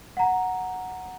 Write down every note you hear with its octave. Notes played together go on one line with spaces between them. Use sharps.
F#5 A#5